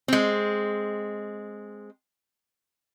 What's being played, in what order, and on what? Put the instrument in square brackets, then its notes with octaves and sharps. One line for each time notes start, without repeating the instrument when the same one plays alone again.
[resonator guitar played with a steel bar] G#3 C4